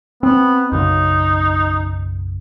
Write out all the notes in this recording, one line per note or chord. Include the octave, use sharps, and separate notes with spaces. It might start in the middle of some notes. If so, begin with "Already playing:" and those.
B3 C4
B1 F#2 C#3 D#4